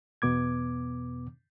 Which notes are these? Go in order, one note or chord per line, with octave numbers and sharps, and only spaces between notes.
E2 B2 B3 D6 G#6